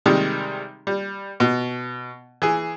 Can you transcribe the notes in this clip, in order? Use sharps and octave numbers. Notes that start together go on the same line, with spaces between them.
C3 D#3 G3 G#3
G3
B2
E3 G#4